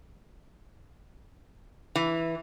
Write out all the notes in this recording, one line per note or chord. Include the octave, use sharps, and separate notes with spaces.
E3